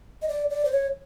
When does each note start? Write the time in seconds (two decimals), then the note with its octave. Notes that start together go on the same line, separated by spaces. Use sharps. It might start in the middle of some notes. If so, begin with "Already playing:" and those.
0.22 D#5
0.28 D5
0.50 D5
0.65 C5
0.71 C#5